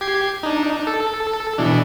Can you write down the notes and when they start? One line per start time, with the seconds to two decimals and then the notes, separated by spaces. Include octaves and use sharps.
0.01 G4 G#6 C7
0.43 D4 D#4
0.87 A4
1.58 B2 E3 D4